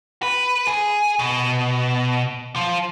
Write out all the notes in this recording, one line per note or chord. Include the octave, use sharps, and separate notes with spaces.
B4
G#4
B2
F3